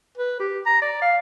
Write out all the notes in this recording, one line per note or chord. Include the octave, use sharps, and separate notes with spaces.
B4
G4
A#5
D5
F5